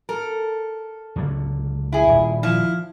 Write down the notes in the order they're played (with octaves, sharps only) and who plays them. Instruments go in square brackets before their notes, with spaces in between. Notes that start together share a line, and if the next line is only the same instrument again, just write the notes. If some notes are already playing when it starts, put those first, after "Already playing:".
[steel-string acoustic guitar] A4 [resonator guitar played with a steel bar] A#4
[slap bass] C#2 D3 F#3
[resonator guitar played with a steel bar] E4 G#4
[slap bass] D#1
[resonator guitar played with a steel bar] F3 [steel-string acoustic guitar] E4